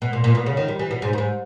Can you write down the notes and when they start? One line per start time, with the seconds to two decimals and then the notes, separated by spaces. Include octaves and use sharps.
0.02 B2
0.13 A#2
0.24 A#2
0.35 B2
0.46 C#3
0.57 D#3
0.68 G3
0.79 E3
0.91 B2
1.02 G#2
1.13 G2
1.18 G#2